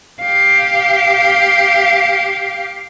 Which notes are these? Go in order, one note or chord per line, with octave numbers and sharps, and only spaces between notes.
G4 F5